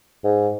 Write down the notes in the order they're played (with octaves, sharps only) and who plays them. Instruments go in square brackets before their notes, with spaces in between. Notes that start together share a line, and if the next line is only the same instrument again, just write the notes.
[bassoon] G#2